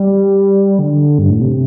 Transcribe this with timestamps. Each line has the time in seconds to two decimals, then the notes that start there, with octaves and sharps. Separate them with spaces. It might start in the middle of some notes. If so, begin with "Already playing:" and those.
Already playing: G3
0.79 D3
1.19 G2
1.30 A2
1.41 C3